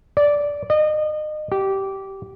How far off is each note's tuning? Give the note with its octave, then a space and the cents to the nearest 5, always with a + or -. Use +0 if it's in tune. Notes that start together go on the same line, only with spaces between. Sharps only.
D5 -10
D#5 -30
G4 -15